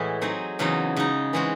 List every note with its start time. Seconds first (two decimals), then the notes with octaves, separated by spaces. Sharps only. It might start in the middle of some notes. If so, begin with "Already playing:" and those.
Already playing: A2 E3 G#3 E4 F#4
0.22 F#3 C4 D#4 G#4
0.59 E2 C#3 F#3 C4 D#4
0.96 C#3 G#3 D#4
1.33 E3 G#3 C4 F#4